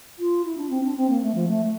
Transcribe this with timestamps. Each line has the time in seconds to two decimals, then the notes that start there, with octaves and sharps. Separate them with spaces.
0.19 F4
0.44 E4
0.57 D4
0.70 C4
0.83 D4
0.96 C4
1.09 A#3
1.22 A3
1.35 F3
1.48 A3